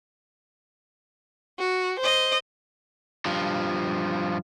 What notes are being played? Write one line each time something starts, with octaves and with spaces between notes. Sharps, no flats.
F#4
C5 D#5
G2 F3